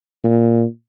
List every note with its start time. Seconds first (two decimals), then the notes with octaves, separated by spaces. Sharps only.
0.24 A#2